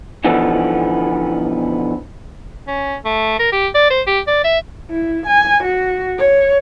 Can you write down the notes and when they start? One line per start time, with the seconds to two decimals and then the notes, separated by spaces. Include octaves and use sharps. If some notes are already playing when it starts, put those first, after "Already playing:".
0.24 B2 D3 E3 F3 B3 D#4
2.67 C#4
3.05 A3
3.39 A#4
3.52 G4
3.75 D5
3.90 C5
4.07 G4
4.27 D5
4.44 E5
4.91 E4
5.27 G#5
5.64 F#4
6.18 C#5